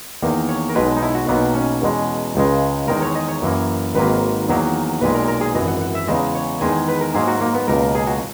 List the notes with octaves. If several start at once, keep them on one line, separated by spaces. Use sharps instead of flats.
E2 D#3 A#3
C#5
A#4
B1 B2 G#3 B4
D#4
E4
F#4
B1 B2 F#3 A#3 B3
C#4
E2 B2 G#3
C#2 C#3 G#3
E2 D#3 G#3 A#4
C#5
D#5
C#5
F#2 E3 A#3
G#1 G#2 F#3 A#3 B4
E2 D#3 F#3 A#3
B1 A#2 G#3 B4
A#4
A#4
G#4
G#1 F#2 E3 D#5
F#5
F#5
E5
E2 C#3 G#3 D#5
C#5
E2 D#3 G#3 G#5
B4
A#4
G#2 F#3 A#3 G#4
F#4
A#3
B3
C#2 B2 A#3 A#4
G#4
F#4